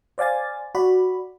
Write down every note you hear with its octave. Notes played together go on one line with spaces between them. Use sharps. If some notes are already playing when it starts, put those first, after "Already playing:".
C5 D5 F5 G#5 A6
F#4 D5 B5